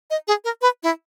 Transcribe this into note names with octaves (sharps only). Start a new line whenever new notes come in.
D#5
G#4
A#4
B4
E4